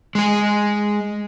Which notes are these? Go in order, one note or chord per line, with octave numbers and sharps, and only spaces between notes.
G#3 G#4